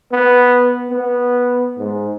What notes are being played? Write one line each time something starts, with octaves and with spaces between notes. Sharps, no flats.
B3
B3
G#2